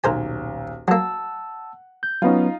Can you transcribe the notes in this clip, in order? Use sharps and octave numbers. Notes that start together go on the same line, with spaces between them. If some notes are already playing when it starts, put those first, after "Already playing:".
D#1 B1 A#4 C5 G#5
F#3 A#3 F#5 A5 E6
G6
F#3 B3 C#4 D#4 F4